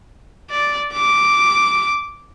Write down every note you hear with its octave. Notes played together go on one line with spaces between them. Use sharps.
D5
D6